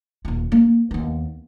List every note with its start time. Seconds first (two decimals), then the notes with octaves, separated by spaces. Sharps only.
0.25 D#1 F4
0.52 A#3
0.91 D#2 B3